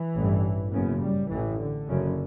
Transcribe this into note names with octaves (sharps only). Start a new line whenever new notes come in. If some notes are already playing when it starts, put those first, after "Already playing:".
Already playing: E3
A1 G2
F#1 F#2 C#3 B3
G3
A1 A2 E3
D3
F#1 F#2 C#3